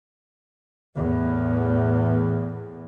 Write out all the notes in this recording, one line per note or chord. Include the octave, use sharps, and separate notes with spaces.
E2 A2